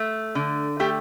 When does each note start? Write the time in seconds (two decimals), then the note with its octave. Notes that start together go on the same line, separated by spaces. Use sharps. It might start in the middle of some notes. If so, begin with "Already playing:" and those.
Already playing: A3
0.35 D3
0.80 A3 G4